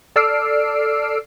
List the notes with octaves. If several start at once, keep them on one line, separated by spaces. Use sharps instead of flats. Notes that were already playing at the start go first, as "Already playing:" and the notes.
A4 D5 E6 F6 C7 D7